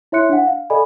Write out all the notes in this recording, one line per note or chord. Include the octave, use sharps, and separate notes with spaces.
E4 C#5 E5 C6 F#6 C#7
D4 F#5
F5
A4 D5 D#5 G#5 B5